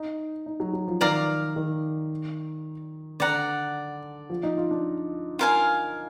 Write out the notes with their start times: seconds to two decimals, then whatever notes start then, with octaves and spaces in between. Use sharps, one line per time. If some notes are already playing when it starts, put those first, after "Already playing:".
Already playing: D#4
0.46 D#4
0.60 F#3
0.73 F#3
0.88 F3
1.01 D#3 D5 F5 A#5 D6
1.56 D#3
3.20 D3 D5 F#5 A#5
4.30 F3
4.43 D#4
4.58 F4
4.71 D4
5.39 F4 A#4 F5 G#5